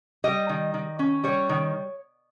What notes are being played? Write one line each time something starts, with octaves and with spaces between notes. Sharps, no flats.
G3 D#5
D#3
D#3
C#4
G3 C#5
D#3